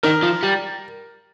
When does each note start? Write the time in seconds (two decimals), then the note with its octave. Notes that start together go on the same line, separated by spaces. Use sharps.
0.03 D#3 A#4
0.23 F3
0.43 G3